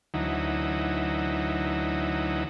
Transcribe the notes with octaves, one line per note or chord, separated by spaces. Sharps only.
D2 E3 F#3 D#4